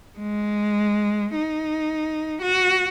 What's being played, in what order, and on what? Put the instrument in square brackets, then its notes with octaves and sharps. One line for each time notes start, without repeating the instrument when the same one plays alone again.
[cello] G#3
D#4
F#4